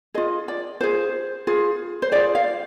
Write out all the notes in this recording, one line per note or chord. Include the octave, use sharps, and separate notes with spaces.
F4 G#4 D#5
D5
F4 G#4 C5
F4 G#4
C5
F4 G#4 D5
F5